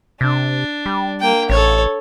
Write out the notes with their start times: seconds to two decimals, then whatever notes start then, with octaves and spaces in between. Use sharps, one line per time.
0.21 C3 D4
0.86 G3
1.20 A#3 G5
1.49 A1 A4 C#5